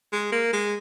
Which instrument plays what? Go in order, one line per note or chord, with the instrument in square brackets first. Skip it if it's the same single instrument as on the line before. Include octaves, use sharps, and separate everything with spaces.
[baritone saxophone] G#3
A#3
G#3